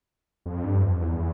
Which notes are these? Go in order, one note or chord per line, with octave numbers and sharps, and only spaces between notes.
F2
G2
F2
E2